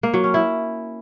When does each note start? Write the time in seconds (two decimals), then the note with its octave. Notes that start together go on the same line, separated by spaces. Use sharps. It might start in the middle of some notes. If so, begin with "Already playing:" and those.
0.03 A#3
0.14 F#3
0.24 C#4
0.34 E4